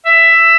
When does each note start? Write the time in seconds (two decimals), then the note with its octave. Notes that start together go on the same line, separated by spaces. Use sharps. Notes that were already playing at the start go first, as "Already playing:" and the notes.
0.06 E5